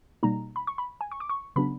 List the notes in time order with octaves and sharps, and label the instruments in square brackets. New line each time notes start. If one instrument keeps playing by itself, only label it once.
[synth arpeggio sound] B2 G3 A#3 D#4 A#5
B5
C#6
B5
G#5
C#6
D6
C#6
C#3 F#3 B3 D4 B5